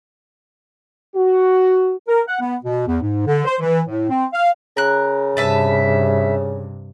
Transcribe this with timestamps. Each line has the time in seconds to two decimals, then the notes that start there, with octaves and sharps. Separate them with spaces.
1.15 F#4
2.07 A#4
2.27 F#5
2.40 B3
2.63 B2
2.86 E2
3.00 G#2
3.26 D3
3.45 C5
3.59 E3
3.87 A2
4.09 C4
4.32 F5
4.77 C#3 A#4 F#6
5.37 G2 C3 B4 E5 A5